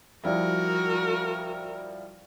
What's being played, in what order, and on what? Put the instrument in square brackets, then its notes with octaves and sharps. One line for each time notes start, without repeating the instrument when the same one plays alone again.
[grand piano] F3 G3 E4 [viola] F#4 A#4